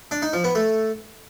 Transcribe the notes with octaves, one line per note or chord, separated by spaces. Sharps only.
D4
D#4
F3
B3
A3